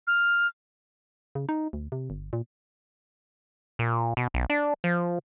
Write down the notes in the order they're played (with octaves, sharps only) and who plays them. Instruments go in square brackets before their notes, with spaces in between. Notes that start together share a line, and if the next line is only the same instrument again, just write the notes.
[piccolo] F6
[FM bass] C#3
D#4
D2
C3
G1
A#2
[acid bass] A#2
B2
B1
D4
F3